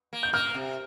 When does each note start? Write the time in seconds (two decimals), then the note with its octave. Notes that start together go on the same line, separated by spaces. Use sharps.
0.13 A#3
0.23 G6
0.33 A#3 F6
0.54 C3